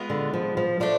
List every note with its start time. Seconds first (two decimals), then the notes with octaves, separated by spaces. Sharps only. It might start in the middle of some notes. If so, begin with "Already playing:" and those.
Already playing: G#3 B3 F4
0.10 D3
0.34 F3
0.57 F3
0.80 F3 A3 D4